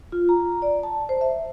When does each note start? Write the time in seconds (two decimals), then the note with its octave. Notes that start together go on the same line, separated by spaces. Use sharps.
0.12 F4
0.29 A#5
0.62 D5
0.83 A5
1.09 C5
1.21 E5